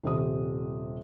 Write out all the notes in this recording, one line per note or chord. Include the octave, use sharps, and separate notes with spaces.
D#1 C3 D#6